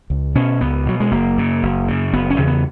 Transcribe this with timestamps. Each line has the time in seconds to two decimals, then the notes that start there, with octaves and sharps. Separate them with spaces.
0.10 C#2
0.35 B2 C#4
0.61 C#2 B3
0.86 B2 F#3
1.00 G#3
1.11 F#1 A#3
1.37 F#2 C#3
1.63 F#1
1.88 F#2 C#3
2.13 F#1 B3
2.30 C#4
2.38 E2 C#3
2.47 B3